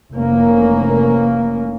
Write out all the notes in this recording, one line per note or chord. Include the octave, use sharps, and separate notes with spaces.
F1 E3 A#3 C#4